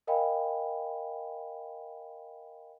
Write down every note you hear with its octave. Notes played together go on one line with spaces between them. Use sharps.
A#4 D#5 F5 G5 G#5 B5